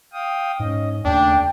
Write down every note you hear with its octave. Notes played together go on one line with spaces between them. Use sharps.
F5 G5 D#6
G#2 C#4 D#5
D#2 C#3 A3 D4 G5